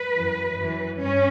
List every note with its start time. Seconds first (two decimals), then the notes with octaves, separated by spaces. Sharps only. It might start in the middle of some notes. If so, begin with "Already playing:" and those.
Already playing: B4
0.13 F#2 E3
0.56 F#2 E3
0.99 G2 C#4